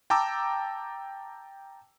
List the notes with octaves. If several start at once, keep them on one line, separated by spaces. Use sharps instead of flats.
G5 A5 A#5 D6 E6